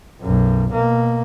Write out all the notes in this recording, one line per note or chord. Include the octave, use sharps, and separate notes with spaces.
B1 F#2
B2 A#3